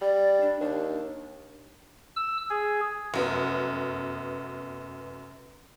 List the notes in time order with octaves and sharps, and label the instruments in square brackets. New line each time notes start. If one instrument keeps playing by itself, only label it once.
[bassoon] G3 [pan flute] D5
[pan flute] D4
[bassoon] D#2 [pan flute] D4
[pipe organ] E6
G#4
[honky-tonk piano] F1 F#2 B3